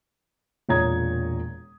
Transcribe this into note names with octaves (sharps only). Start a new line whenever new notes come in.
E1 A#2 C#5 A#5 D#6 G#6